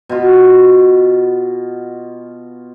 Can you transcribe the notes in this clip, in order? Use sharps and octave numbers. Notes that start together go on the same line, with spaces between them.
B2 F4